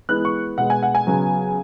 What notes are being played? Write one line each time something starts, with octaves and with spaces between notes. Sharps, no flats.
E3 G#3 B3 F#6
C#6
B2 G#3 B3 F#5
G#5
F#5
G#5
C#3 F#3 B3